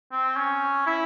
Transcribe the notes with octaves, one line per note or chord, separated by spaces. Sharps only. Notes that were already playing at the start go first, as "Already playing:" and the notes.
C4
C#4
E4